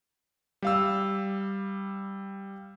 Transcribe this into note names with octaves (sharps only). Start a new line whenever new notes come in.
G3 F5 E6